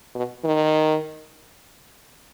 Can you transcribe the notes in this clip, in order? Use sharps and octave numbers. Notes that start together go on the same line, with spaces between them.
B2
D#3